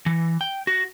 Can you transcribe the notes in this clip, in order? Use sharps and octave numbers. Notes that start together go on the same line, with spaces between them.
E3
G5
F#4